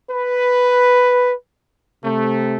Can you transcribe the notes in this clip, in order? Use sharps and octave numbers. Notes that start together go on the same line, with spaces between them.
B4
C3 A3